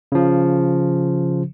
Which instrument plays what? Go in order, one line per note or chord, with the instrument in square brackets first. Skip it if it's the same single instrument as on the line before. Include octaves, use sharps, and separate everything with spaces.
[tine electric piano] C#3 F3